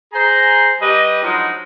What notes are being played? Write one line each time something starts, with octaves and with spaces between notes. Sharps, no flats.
G#4 C5 A#5
G3 G4 B4 D#5
F3 F#3 G#3 D4 D#4